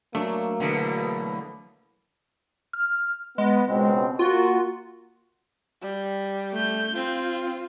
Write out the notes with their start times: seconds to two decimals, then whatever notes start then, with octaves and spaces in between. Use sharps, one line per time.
0.15 F#3 A3 A#3 D4
0.60 E2 B2 D3
2.73 F6
3.38 G#3 B3
3.68 C#2 B2 C4
4.19 A#3 F4 F#4
5.82 G3
6.53 A3 G6
6.95 C4 F4